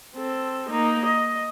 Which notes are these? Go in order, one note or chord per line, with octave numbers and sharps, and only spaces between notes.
C4 A4
A#3 D#4
D#5